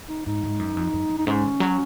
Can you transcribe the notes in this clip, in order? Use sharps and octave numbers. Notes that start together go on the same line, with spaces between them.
D#4
G#2 D#4
G#2
F#2
F2
F#2
F#2
D#4
G#2 C#4
D#3
F#3